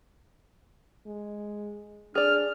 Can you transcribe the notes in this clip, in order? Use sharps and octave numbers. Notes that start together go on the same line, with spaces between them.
G#3
D4 G#4 D5 F6